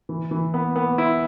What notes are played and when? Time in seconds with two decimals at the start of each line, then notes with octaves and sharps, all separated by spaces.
0.09 E3
0.31 E3
0.54 B3
0.76 B3
0.98 E4